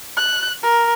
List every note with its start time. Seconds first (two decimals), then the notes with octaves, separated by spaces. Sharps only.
0.17 F#6
0.63 A#4